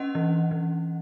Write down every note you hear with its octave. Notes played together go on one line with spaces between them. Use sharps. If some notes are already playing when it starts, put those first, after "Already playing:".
Already playing: C#4 D#5 F#5
E3
E3